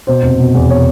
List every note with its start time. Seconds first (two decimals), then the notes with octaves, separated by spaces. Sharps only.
0.07 B2 C5
0.23 F1
0.39 B2
0.54 E2
0.70 B2 C#5